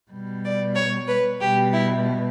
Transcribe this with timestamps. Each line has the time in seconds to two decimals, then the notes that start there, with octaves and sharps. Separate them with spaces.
0.11 B2 G3
0.44 D5
0.75 C#5
1.07 B4
1.40 B2 G3 G4
1.72 E4